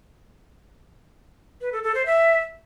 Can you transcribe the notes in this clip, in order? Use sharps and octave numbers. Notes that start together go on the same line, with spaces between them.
B4
A4
A4
C5
E5